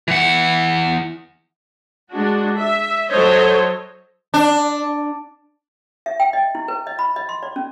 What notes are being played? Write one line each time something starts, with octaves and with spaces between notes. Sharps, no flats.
E3 F#5
G#3 D4 F#4
E5
F#3 A4 C5 C#5 D#5
D4
E5
G5
D#5
E4
B4
D#5
B5
D#5
C6
D5
C#4